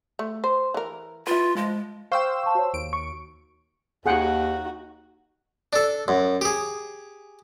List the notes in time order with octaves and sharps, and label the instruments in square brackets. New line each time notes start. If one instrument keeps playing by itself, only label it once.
[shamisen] A3
C5
E3 A#4
[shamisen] E4 B4 [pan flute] F4
[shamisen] F3 [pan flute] G#3
[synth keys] C5 E6 [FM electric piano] F5 G5 [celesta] C#6
[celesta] A5 C#6
F#4 C#5
[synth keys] D#2 D7
[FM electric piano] C#6
[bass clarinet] D#2 [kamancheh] D#4 F#4 [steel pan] G#4 F#5 G5
[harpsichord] D4 A4
F#2
G4 G#4